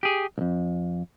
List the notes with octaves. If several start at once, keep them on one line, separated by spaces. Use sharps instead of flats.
G4 G#4
C2 F2